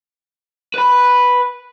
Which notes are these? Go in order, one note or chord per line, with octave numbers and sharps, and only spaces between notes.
B4 B5